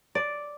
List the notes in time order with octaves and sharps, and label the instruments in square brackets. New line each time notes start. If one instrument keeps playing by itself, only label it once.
[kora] D5